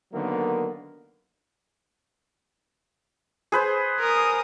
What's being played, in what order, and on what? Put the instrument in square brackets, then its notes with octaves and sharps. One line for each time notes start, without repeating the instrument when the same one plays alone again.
[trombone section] D3 D#3 F#3 A#3 B3
[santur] G#4 B4 C5
[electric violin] A#4 D#6